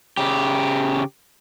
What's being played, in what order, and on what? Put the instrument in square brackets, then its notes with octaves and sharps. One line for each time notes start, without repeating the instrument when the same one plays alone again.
[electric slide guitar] C#3 G4